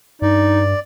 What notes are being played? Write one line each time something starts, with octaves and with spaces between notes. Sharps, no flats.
G2 D#4 D5